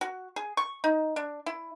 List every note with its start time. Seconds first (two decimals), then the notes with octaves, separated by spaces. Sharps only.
0.01 F#4
0.36 G#4
0.57 C#6
0.84 D#4
1.16 D4
1.46 E4